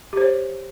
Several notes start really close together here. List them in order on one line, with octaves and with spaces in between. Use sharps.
G4 C5 C#5